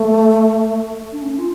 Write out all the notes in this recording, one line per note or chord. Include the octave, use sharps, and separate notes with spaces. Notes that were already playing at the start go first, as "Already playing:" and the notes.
Already playing: A3
D4
C#4
F4